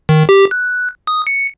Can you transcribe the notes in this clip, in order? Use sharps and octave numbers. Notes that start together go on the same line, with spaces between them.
D#3
G4
F#6
D#6
C#7